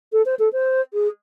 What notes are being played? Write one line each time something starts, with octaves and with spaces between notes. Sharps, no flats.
A4
C5
A4
C5
G#4